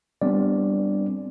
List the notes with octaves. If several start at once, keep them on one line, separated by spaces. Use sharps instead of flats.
G3 B3 C4 D4 D5